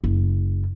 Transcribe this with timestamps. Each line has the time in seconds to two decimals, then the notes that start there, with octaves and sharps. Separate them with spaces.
0.04 F#1